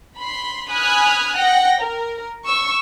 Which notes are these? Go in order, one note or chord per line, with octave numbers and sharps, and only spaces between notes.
B5 C6
G#5 B5 D#6 F6 F#6 G#6
F#5 G5 A#6
A#4
C#6 E6